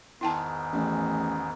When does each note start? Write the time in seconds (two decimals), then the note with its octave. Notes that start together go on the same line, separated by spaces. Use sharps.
0.21 E2 G#2 D#3 E4 G5 A5
0.72 A1